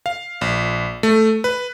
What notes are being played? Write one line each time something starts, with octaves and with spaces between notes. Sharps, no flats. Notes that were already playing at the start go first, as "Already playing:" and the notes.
F5
A#1
A3
B4